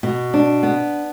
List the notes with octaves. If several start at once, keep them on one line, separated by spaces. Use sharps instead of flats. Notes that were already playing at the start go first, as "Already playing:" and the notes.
B2
D4
B3